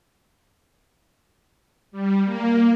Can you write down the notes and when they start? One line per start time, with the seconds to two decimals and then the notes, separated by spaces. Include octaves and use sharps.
1.92 G3
2.25 A#3